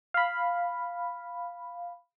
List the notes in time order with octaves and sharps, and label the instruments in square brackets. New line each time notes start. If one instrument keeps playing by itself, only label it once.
[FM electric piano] F5 B5